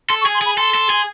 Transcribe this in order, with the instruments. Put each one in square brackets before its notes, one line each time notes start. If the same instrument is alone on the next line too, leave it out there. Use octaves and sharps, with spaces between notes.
[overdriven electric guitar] A4 [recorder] C6
[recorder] C#6
[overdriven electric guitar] G#4
[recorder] C6
[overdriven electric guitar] G#4 [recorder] B5
[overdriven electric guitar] A4 [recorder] C6
[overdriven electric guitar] A4
G#4